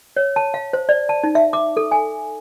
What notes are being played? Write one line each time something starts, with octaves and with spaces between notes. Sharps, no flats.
C#5
A5
F5
C5
D5
A5
D#4
E5
D6
A4
G#5